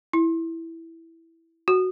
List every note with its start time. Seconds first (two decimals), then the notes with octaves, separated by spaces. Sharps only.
0.13 E4
1.68 F#4